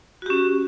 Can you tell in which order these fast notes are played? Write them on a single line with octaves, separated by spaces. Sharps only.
F#4 G4 C#4